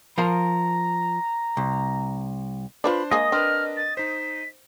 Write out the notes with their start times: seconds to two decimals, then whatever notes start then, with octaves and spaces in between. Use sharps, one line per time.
0.18 F3 A#4 F5 A#5
1.57 C2
2.84 D4 F4 B4 C5 D5 B5 C6
3.12 G#3 A#3 G#4 D#5 D#6
3.32 C4 D4 A#4 B4 F6
3.77 A6
3.97 D#4 C5 B6